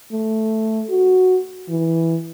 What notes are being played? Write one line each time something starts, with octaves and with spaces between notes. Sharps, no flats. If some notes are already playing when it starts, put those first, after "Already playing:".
A3
F#4
E3